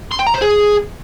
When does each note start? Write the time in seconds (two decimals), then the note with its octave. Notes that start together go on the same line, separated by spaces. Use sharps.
0.11 C6
0.19 G5
0.27 A#5
0.34 C5
0.42 G#4